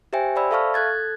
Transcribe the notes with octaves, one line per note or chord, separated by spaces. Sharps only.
G4 C5 E5 G5 G#5
C5 D5 B5 E6
A4 E5 F5 A5 C#6 F6
A4 F#6 G#6 A6